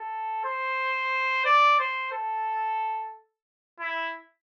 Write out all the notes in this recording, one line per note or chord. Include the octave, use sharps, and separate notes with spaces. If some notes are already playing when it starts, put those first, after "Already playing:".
Already playing: A4
C5
D5
C5
A4
E4